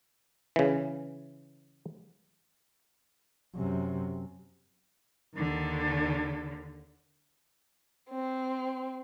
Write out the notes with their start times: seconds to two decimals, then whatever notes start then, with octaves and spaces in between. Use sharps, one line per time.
0.56 C#3 E3
3.56 F#2 C3
5.36 D#2 D3
8.08 C4